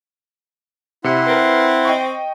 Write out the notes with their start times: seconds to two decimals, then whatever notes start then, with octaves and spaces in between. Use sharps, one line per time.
1.04 C3 E4 F#5 C6 C#7
1.27 C4 A#4 B4
1.85 D#5 G5 C#6